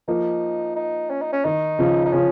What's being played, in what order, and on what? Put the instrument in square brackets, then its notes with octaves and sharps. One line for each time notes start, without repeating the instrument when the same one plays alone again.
[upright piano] F3 A#3 [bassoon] D#4
[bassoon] D#4
C#4
D#4
C#4
[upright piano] D#3 [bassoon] D#4
[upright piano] C#3 F3
[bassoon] D#4
[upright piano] C#3 F3 [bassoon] C#4